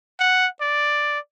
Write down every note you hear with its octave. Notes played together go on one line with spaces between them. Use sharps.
F#5
D5